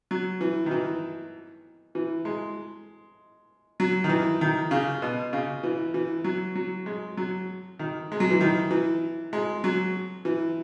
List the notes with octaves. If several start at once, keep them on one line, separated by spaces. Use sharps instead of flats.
F#3
E3
D#3
E3
E3
G#3
F#3
D#3
E3
D#3
C#3
B2
C#3
E3
E3
F#3
F#3
G#3
F#3
D#3
G#3
F#3
E3
D#3
E3
G#3
F#3
E3